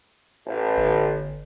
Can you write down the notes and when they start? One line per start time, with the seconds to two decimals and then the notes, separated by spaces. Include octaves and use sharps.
0.46 A1
0.77 G1